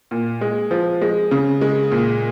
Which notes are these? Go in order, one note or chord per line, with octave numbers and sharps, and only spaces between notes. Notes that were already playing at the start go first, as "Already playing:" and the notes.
A#2
G#3
F3
G#3
C#3
G#3
A#2